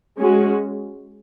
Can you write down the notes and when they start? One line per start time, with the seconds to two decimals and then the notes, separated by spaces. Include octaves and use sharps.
0.19 G#3 C#4 F#4